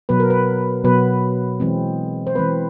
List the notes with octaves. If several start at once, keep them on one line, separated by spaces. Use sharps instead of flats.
B2 F#3 B3 B4
A#4
B4
B2 F#3 B3 B4
E3 G#3 C4
C5
E3 G#3 C4 B4